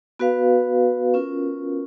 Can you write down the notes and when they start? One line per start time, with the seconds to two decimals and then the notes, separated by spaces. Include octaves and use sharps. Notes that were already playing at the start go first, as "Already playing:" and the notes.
0.19 B3 F#4 B4 F5
1.14 C#4 F4 A#4